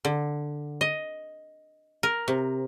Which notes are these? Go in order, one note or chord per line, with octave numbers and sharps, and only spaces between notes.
D3
D#5
A#4
C3